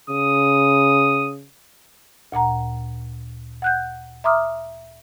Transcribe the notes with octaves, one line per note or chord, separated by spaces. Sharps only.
C#3 D#6
D2 A#2 F#5 A#5
F#5 F#6 G6
E5 A#5 C6 D6 D#6 F6